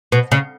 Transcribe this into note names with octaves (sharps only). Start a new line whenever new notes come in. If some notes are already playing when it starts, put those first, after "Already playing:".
B2
C#3